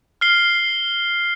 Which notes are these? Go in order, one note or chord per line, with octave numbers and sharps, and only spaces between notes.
F6 C7 G7